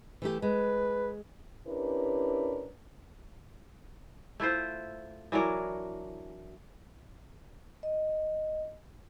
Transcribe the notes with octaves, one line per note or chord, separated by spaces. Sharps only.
E3 A3 G4
G#3 B4
C#4 D4 E4 G4 A#4 B4
A3 E4 F4 C5
E3 F#3 D4 A#4
D#5